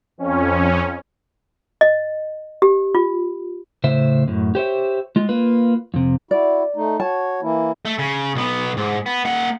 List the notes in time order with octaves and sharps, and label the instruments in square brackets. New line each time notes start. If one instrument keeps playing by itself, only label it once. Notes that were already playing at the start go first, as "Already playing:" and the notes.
[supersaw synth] F2 C#4
[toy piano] D#5
G4
F4
[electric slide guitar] A2 C#3 C5 E5
F#2 A2
G4 C5 C#5 E5
G#3 F4
A#3 F4 B4
F2 C3
[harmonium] E4 F#4 [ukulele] D5
[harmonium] A3 D#4
[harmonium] F#4 C#5 [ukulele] A5
[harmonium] E3 A#3 E4
[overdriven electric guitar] A3
C#3
B1 B3
G#2
B3
A#3 F#5